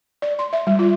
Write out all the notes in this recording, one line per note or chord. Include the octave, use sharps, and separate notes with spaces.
D5
C6
E5
G3
F4